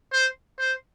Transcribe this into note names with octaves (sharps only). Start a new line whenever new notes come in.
C5
C5